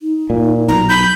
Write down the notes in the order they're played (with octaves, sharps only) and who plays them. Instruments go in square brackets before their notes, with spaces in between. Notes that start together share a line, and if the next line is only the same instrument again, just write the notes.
[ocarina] D#4
[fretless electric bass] A#2
[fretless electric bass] B1 [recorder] A#5
[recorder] B5 [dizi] G6